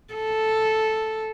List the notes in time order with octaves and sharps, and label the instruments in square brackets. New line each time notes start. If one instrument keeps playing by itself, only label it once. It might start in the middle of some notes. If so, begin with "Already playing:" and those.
[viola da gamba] A4